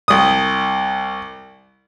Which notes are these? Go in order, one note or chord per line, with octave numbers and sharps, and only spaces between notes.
C2 D#6